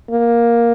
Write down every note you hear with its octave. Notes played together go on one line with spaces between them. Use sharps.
A#3